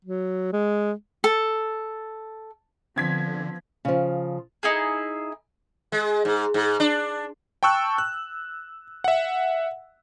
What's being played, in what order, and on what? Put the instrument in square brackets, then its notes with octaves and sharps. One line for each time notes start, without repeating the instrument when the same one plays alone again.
[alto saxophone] F#3
G#3
[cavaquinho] A4
[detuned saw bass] D3 [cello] F3 B3 [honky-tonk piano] C4 G#6 B6
[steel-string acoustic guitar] C#3 F3
[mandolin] D#4 E4 G#4
[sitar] G#3
G#2
G#2
D4
[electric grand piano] G5 A5 C#6 E6 F#6
F#6
E5 F#5